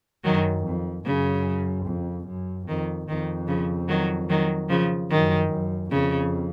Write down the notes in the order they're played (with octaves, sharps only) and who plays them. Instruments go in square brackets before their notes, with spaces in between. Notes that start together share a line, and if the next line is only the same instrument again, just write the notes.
[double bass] F#2 [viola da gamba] D#3 F#3
[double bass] F2
[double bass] F#2 [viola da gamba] C#3
[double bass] F2
F#2
[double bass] F2 [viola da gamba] D#3
[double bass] F2 [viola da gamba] D#3
[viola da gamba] C#3 F3
D#3 F#3
D#3 F#3
C#3 F3
[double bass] F#2 [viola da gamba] D#3
[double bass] F#2
[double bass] F2 [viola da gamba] C#3